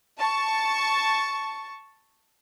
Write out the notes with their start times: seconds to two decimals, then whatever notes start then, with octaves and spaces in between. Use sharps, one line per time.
0.18 A5 C#6